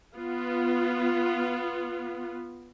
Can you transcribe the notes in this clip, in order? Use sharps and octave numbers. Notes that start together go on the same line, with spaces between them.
B3 F4